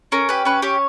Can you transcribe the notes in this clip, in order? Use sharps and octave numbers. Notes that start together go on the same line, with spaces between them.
C#4 A#4
G4 B4
C#4 B4
G4 C#5